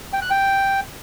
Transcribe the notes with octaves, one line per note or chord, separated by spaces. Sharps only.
G5
F#6
G5